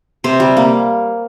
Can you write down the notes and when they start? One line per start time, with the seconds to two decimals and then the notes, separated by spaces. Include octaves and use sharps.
0.24 C3 C5
0.40 G3
0.57 A#3